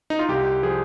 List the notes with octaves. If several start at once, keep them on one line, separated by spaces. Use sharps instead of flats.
D#4
F4
C2 G4
F3 G#4